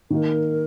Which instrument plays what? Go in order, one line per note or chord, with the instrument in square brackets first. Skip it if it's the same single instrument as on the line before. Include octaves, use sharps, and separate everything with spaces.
[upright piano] D#3 A#3 D#4 [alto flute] A#4